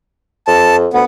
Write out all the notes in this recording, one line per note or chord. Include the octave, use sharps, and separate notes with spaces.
F2 A5
D2 B3